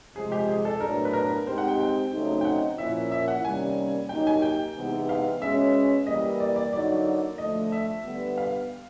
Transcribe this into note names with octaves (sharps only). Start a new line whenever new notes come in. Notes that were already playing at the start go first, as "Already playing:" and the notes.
C3 F3 G#3 G#4
G4
G#4
A4
A2 F#3 B3 D4 A#4
B4
A#4
G#3 C4 D#4 G4 C5
F#5
G5
G5
C#3 F#3 A3 C4 D#4
G5
F#5
A#2 F3 A#3 C#4 E4 E5
E5
F#5
C3 D#3 G3 A#3 C#4 G#5
F#3 A#3 D#4 G4 G5
G#5
G5
C3 E3 G#3 B3 D#4
F5
B2 G#3 C#4 E5
E3 G3 A#3 D#5
D5
D5
D3 F#3 A#3 D#4 D5
D3 F3 A3 D#5
E5
D3 G3 B3
F5